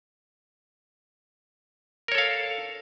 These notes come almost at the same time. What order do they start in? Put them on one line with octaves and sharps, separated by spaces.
A#4 C#5 A4 F5